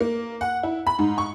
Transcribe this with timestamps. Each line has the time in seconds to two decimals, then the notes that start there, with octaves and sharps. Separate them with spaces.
0.01 A#3
0.41 F#5
0.63 E4
0.87 B5
0.99 G#2
1.18 C#6